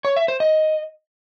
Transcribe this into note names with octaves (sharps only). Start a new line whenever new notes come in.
C#5
E5
C5
D#5